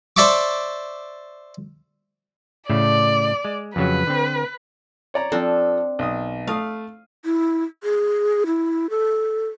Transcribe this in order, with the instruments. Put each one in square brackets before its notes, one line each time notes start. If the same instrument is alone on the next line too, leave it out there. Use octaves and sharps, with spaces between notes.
[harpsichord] C5 D5 E5 A5 C#6 D6
[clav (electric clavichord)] A2 C#3 A3 [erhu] D5
[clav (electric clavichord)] G#3
[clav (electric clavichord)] F2 C#3 F#3 [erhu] B4
[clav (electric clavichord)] D3 C4
[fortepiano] C#5 D5 A#5
[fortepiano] F3 A4 [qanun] C4 D4
[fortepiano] B1 D#6
[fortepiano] A3 D#6 [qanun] F5
[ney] E4
G#4
E4
A4